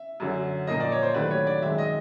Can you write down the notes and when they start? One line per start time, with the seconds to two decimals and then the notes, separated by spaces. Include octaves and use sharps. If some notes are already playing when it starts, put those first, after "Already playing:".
Already playing: E5
0.20 F#2 D3 F#3
0.67 A#2 F3 A#3 D#5
0.80 D5
0.92 C#5
1.03 C5
1.14 C3 D#3 F#3 A3 D4 B4
1.31 C#5
1.47 D5
1.62 F#2 D#3 G#3 C4 E5
1.78 D#5